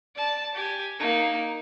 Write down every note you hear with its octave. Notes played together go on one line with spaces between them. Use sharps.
D5 A5
G4 G#5
A#3 D#4